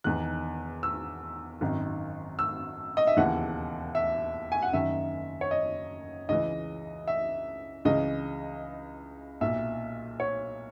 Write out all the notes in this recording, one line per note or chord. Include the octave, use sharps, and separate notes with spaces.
E1 E2 D#3 F#6
E6
G#1 F#2 D#3
E6
D#5
E5
E1 D#2 C#3 E3 F#5
E5
G#5
F#5
F#1 F#2 D#3 E5
C#5
D#5
C#2 C#3 E3 D#5
E5
C#2 C#3 E3 D#5
B1 A#2 E5
C#5